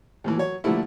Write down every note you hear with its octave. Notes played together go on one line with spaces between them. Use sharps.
D#2 A2 E3
F#3 C#5
A#2 D3 F3 G3 A3 E4